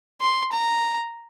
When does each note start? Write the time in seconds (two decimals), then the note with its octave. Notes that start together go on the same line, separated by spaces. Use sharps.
0.21 C6
0.52 A#5